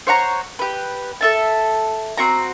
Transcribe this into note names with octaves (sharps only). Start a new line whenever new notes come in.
C5 C#5 F#5 A#5
G4 B4
A4 E5 A5
C4 F#4 A#5